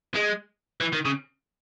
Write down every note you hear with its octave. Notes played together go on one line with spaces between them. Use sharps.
G#3
E3
D#3
C#3